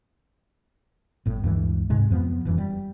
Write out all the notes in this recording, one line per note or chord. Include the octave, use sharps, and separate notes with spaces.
G1 A2
D2 G2 E3 G#3
G#2 C3 G#3
F2 F3 A#3 B3
E1 F#2 E3
G3